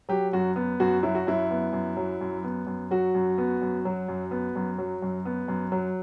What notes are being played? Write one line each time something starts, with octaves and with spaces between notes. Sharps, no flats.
F#3 G4
F#2 F#4
B3
F#2 F#4
F#3 E4
F#4
F#2 E4
B3
F#2
F#3
F#2
B3
F#2
F#3 F#4
F#2
B3
F#2
F#3
F#2
B3
F#2
F#3
F#2
B3
F#2
F#3